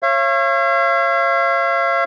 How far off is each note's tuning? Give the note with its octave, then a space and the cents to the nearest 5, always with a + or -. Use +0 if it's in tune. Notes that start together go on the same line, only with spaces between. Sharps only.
C#5 -30 F5 -45